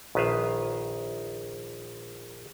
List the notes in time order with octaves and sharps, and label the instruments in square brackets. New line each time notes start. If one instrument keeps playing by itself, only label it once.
[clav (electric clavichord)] A#1 D#3 B4 E5 F5